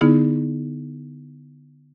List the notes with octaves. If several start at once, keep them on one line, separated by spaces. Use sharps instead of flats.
D3 B3 D#4 E4 G#4